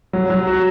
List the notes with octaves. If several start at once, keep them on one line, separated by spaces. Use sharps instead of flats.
F#3
F#3
F#4